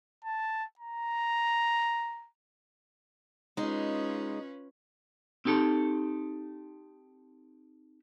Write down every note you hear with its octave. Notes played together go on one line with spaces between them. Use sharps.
A5
A#5
G#3 C#4 D#4 F4 B4
C4 D#4 G4 A4